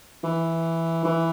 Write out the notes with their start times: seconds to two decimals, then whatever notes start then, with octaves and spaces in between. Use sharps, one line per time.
0.24 E3
1.05 E3